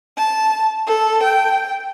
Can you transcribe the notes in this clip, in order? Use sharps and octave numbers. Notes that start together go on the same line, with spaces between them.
A5
A4
G5